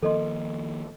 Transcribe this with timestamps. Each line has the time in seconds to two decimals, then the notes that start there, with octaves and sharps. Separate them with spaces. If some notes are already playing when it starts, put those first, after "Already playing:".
0.03 D#3 F3 A#3 A4 D#5 C6